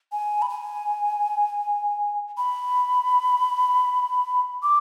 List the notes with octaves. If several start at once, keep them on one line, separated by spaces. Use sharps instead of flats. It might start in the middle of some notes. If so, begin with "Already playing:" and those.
G#5
B5
G#5
B5
D6